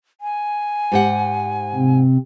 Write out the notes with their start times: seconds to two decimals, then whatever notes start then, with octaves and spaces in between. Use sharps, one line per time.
0.21 G#5
0.92 G#2 G4 F#5
1.75 C3 C4